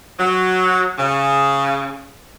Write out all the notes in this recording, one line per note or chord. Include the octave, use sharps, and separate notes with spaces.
F#3
C#3